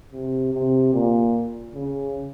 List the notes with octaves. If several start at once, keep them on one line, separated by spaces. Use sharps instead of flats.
C3
C3
A#2
C#3